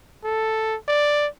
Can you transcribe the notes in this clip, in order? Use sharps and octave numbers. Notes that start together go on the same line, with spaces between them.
A4
D5